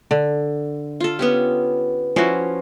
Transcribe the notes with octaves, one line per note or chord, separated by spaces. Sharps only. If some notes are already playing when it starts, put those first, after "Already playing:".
D3
F4 A4
B3 C#4 G4
F3 C#4 E4 F#4